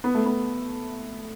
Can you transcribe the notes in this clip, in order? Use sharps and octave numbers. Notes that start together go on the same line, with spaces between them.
B3
A3
B3